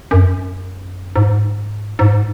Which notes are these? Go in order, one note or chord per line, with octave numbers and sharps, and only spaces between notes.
F#2
G#2
G#2